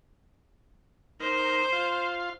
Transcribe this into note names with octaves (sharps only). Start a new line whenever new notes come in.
D#4 A#4 C5
F4 F5